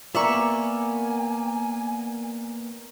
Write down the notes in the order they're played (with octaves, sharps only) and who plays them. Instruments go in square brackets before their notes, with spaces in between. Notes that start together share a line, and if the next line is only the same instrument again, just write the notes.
[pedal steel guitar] A#3 B3 [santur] A#4 D5 [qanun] E5 B5 C#6 [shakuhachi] G#5